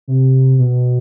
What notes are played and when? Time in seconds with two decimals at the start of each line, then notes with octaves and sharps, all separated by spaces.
0.08 C3
0.58 B2